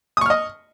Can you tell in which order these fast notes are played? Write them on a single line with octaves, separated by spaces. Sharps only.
D#6 C#6 F6 D#5